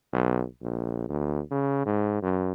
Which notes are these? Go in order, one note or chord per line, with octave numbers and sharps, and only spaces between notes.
B1
A#1
D2
C#3
G#2
F#2